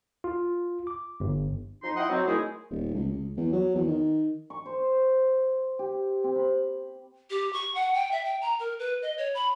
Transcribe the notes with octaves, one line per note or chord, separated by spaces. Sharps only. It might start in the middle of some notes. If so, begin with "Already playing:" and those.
F4
D6
G1
F2 D#4 C6
D#4 E4 D#5 F#5 G5 C6
F#3 C4
D#3 G#3 A3 E4 G#4 C5
D#1
C#2
C#2
E2
F#3
E2
D#3
C#6
C5
G4
C4
B5
G4
C#6
F#5
G5
E5
G5
A#5
A#4
B4
D#5
C#5
B5